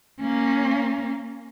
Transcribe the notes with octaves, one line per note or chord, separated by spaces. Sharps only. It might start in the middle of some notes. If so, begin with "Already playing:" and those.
A#3 C#4